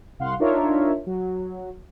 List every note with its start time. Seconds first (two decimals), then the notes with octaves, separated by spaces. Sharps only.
0.19 C2 F5 F#5 C6
0.39 D4 D#4 F4 A#4 C#5 E5
1.06 F#3